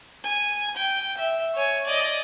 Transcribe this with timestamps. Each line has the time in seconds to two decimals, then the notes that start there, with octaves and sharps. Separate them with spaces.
0.24 G#5
0.76 G5
1.17 E5
1.55 C#5 G#5
1.86 D5 D#5